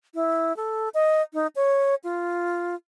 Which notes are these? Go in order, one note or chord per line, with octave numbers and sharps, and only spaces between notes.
E4
A4
D#5
D#4
C#5
F4